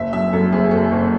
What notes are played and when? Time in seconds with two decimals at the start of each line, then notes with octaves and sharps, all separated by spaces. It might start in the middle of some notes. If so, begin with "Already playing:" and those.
Already playing: F#1 E5
0.13 F#2 E5
0.33 F#2 A4
0.52 F#1 G#4
0.71 F#1 A4
0.91 F#1